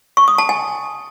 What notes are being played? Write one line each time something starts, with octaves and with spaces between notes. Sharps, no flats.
C#6
D#6
A5
G#5